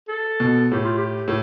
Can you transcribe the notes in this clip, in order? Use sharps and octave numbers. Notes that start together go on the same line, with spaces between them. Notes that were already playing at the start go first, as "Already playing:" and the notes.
A4
B2
A2 G4
F4
G4
A2